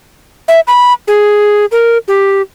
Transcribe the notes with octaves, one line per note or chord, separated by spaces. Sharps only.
E5
B5
G#4
A#4
G4